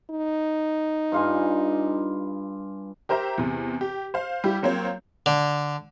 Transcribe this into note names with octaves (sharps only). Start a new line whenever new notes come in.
D#4
G2 F4 G#5
G4 A#4 C5 E5 A#5
E2 C3
G4
C5 F5
G3 E4 G4
F#3 A#3 C4 F4 C#5
D3